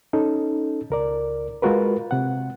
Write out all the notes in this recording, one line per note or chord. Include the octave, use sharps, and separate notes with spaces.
C#4 D#4 A4
C#2 A#4 D5
G#3 F4 F#4 A#4 B4
C3 F#5